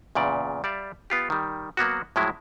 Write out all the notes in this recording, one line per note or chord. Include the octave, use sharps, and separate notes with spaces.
E2 A#2 C#3 D5
G3 D5 E5 F5
B3 F4 G4
D#3 G3
F#3 A#3 B3 F#4
A2 F3 F#3 G#3 E4